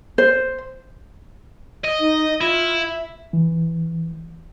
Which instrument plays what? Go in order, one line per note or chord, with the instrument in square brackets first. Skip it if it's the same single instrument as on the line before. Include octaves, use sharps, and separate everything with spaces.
[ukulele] C5
[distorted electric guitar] D#5
[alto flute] D#4
[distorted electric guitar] E4 [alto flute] F4
[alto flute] E5
[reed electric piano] E3